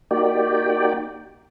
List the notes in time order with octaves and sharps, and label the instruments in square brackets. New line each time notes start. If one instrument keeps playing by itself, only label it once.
[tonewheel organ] A#3 D#4 F#4 G4 D5 G5